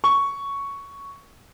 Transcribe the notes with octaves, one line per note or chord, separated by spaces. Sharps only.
C#6